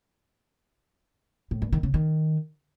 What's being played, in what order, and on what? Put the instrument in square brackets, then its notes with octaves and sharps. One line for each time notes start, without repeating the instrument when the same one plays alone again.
[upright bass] A2
G2
D#3
C#3
D#3